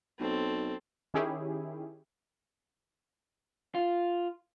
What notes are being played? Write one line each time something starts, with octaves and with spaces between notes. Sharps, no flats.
B1 C4 A4
D#3 C#4 E4 G4 G#4
F4